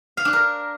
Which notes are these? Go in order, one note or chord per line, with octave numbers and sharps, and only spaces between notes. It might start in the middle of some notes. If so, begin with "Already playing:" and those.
F5
D4
A#4